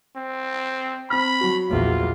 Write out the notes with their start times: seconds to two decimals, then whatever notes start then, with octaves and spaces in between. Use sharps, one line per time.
0.16 C4
1.10 C4 B5 F6
1.41 F#3 F#4
1.70 A#1 E2 F4